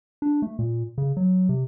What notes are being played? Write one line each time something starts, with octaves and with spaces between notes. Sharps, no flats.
D4
A3
A#2
C#3
F#3
C3